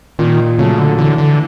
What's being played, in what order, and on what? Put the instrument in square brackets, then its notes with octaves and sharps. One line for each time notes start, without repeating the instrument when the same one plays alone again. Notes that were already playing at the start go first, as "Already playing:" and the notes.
[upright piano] A#2 [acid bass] D#3
[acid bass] C#3 [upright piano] F#3 A3
[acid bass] D3
[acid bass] D3 [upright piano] E3
[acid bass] D3